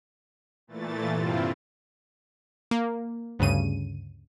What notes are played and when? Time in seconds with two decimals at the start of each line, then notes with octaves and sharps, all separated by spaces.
0.67 A#2 E3 A3 A6
1.08 G2 C3 C4 E4 F4
2.71 A#3
3.39 D2 G2 C#3 D#7